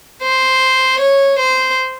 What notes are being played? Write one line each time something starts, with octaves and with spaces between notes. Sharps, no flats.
C5
C#5
C5